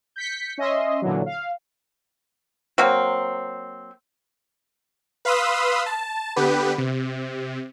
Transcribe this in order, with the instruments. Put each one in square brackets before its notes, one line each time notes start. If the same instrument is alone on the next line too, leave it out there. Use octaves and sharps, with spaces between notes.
[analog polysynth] G6 B6 C#7
C#4 D#5 E5 C6
A#2 D3 E3 F#3
F5
[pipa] F#3 A#3 C4
[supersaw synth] B4 F5 B5 C6 D#6 E6
A5
D3 B3 G4 B4
C3